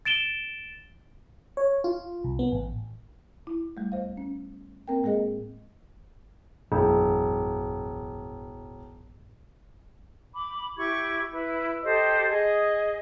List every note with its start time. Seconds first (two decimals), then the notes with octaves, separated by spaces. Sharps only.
0.05 A6 D7 E7 G7
1.57 C#5
1.84 F4
2.24 C2
2.39 B3
2.52 A1
3.47 E4
3.77 G3 A3
3.92 D2 C5 F5
4.17 C#4
4.88 A#3 C4 A#4 G5
5.03 A2 G#3 A#3 G#4 D#5
6.72 E1 A1 F#2
10.34 B5 D6
10.78 E4 G4 C#6 G#6
11.31 E4 B4
11.82 G4 A4 C5 D#5
12.29 G#4 D#5